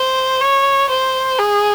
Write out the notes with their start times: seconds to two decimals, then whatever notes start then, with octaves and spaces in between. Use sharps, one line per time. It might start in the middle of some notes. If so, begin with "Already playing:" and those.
Already playing: C5
0.41 C#5
0.90 C5
1.39 G#4